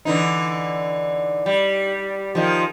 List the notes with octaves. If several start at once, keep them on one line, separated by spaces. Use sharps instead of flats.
D3 E3 D#4
G3
D#3 F3